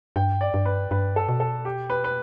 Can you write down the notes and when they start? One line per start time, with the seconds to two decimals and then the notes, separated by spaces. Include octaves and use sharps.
0.16 G2 G5
0.41 D5
0.54 G2
0.65 B4
0.91 G2 B4
1.16 A4
1.29 B2
1.40 A4
1.65 G4
1.90 B4
2.04 B4